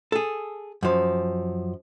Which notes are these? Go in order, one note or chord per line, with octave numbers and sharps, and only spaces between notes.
G#4 A4
F#2 F3